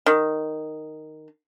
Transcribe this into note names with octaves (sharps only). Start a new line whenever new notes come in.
D#3